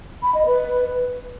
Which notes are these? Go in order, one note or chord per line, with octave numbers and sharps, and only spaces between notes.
B5
D#5
B4